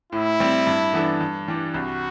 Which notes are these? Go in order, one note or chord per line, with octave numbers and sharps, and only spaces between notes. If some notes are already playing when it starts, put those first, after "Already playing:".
A2 E4
G3 C4
G2
E3 B3 D4 A4
G2
E3 G3 D4
C2 F#4